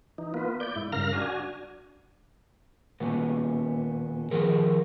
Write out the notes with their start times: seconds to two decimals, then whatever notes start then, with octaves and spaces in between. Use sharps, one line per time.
0.18 E3 D#4
0.34 A#3 B3 F4 B4
0.60 D5 G6
0.76 G#2 E4
0.92 G2 C#3 A#4 F5 F6 A#6
1.13 D4 F#4 G#5
3.00 D#2 A#2 B3
4.31 D#3 F3 G#4 A#4